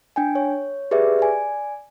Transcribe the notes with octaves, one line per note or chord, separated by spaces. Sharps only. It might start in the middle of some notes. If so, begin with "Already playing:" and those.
D4 G5 G#5
C#5
G4 G#4 B4 D5 E5
D5 G#5